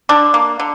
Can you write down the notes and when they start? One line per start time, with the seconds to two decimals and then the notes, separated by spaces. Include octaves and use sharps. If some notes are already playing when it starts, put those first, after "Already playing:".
0.09 D3 D4
0.34 A#3
0.60 D3